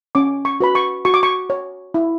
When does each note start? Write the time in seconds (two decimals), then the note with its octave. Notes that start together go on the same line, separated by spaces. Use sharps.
0.15 C#4 D6
0.45 C#6
0.60 F#4 B4 B5
0.75 C#6
1.05 F#4 C#6
1.14 D6
1.23 C#6
1.50 C#5
1.94 E4